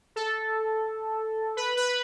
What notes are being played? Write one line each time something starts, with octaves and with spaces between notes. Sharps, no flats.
A4
B4
B4